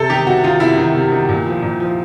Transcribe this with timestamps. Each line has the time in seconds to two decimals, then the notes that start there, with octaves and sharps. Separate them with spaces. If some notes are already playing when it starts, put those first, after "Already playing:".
Already playing: C3 A4
0.10 D#3 G4
0.27 C3 F#4
0.44 D#3 F4
0.60 C3 E4
0.78 D#3
0.95 C3
1.12 D#3
1.29 A#2
1.46 F3
1.62 A#2
1.80 F3